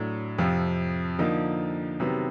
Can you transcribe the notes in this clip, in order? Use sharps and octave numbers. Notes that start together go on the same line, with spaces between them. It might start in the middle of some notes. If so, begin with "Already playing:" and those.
Already playing: A2 F#3 A3 D4
F2 C3 F3
D3 F3 A#3 D#4
C3 D#3 F#3 B3